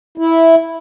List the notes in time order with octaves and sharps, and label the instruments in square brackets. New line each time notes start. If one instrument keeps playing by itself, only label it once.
[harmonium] E4